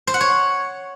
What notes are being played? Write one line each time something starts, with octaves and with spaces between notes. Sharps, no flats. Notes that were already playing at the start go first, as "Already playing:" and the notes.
C5
F#5
C#5